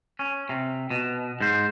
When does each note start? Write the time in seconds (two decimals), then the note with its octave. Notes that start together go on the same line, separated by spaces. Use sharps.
0.19 C#4
0.49 C3
0.90 B2
1.41 G#2 C5